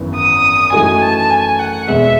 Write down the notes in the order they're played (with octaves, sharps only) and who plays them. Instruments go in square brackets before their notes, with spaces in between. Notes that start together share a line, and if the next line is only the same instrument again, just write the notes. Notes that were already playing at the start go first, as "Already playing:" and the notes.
Already playing: [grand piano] G#1 F#2 E3 B3
[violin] D#6
[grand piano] F#2 E3 A3 D#4 F#4 [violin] G#5
[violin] A5
G#5
F#5
[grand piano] E1 E2 B2 G#3 [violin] E5